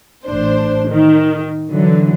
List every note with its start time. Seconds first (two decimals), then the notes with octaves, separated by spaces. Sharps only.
0.25 A1 D4 C5
0.90 D#3
1.70 D3 E3 F#3